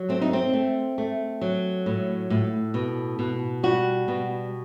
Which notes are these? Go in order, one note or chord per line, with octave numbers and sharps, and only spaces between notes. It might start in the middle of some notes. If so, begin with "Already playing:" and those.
Already playing: F#3
A3 C4
D#4
C4
A3
A3
F#3
A2
A2
B2
B2
G3 F#4
B2